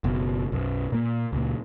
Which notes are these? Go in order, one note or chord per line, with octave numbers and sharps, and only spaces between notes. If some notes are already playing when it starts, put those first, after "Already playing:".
F#1 B2
B1 F#2
A#2 A#3
C#2 A#2